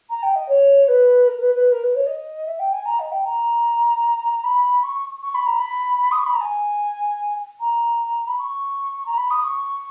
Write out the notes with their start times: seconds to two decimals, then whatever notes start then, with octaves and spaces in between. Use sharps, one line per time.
0.09 A#5
0.22 G5
0.35 D#5
0.48 C#5
0.88 B4
1.28 A#4
1.40 B4
1.54 B4
1.72 A#4
1.83 B4
1.95 C#5
2.06 D#5
2.46 E5
2.59 G5
2.73 G#5
2.85 A#5
2.99 D#5
3.12 G5
3.25 A#5
4.43 B5
4.83 C#6
5.22 C#6
5.34 B5
5.46 A#5
5.58 B5
6.01 B5
6.11 D#6
6.19 C#6
6.26 B5
6.33 A#5
6.41 G#5
7.60 A#5
8.27 B5
8.38 C#6
9.05 A#5
9.17 B5
9.30 D#6
9.43 C#6